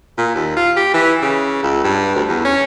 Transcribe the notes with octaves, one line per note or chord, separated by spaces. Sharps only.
A#2
D#2
F4
G4
E3
C#3
C#2
G2
D2
E2
C#4